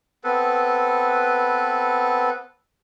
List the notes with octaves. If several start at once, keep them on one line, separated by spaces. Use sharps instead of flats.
B3 C4 A4 B4